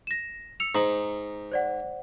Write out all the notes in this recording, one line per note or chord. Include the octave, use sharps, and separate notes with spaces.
A#6 E7
E6 C#7 F7
G#2 A#5 D#6 F#7
C5 D5 F#5